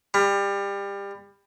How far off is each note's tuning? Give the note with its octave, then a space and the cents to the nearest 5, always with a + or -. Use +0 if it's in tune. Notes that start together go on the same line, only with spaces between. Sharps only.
G3 +25